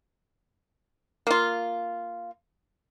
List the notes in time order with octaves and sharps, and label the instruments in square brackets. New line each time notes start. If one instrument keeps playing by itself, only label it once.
[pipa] A#3 F4